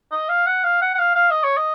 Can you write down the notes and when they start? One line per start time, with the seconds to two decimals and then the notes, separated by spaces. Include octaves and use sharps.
0.12 D#5
0.29 F5
0.46 F#5
0.64 F5
0.82 F#5
0.94 F#5
0.98 F5
1.15 F5
1.30 D#5
1.44 C#5
1.57 D#5